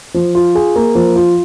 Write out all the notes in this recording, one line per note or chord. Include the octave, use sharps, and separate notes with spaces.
F3
F4
G#4
A#3
F3
F4